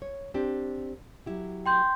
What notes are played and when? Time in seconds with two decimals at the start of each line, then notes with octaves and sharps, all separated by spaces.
0.02 C#5
0.34 C4 D4 G4
1.26 F#3 E4 G4
1.66 G5 C6 G6